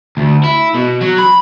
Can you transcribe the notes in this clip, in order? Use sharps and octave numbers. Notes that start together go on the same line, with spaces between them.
D2
E4
B2
F#3
B5